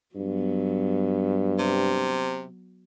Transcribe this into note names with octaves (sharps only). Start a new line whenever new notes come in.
G2 F#3 B3
C3